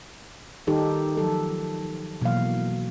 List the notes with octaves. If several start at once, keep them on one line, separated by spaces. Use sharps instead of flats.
D#3 D#4 G4 A4
F3 F#3 A4
B2 E3 F#3 A#3 F5